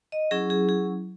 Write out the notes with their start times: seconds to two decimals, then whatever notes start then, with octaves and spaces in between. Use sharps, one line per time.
0.12 D#5
0.31 F#3 C#4 E4 G#4
0.50 G#4
0.69 G#4